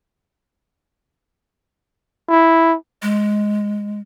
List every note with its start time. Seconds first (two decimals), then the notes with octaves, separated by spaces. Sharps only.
2.29 E4
3.02 G#3